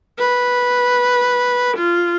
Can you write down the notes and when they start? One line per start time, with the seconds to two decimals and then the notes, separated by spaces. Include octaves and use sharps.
0.19 B4
1.78 F4